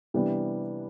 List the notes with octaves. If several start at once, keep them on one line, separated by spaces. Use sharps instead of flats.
C3 E3 G3 B3 D4